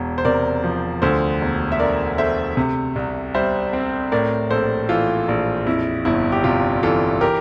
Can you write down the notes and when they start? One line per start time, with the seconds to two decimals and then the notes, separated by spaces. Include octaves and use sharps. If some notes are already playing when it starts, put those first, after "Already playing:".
Already playing: E1 E2
0.18 C5
0.25 C3 A#4 D5
0.64 F3
1.02 D2 A4 C5
1.41 E1
1.72 E5
1.80 D3 A#4 D5
2.18 A3 C5 E5
2.57 C3
2.96 C2
3.34 G3 C5 E5
3.73 C4
4.12 A2 A#4 D5
4.51 A#1 A4 C5
4.89 E3 F4 A4
5.28 A#1
5.66 F2 E4
6.05 G1 E4
6.32 G4
6.44 C3 F4
6.83 E3 F4 A4
7.21 G4 A#4